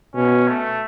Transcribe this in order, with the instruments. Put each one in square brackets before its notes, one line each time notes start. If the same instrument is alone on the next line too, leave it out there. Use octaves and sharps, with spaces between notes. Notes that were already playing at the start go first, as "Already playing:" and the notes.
[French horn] B2 [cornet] C#4
[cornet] A3